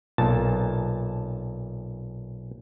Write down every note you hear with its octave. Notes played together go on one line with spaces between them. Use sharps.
B1 A#2 A5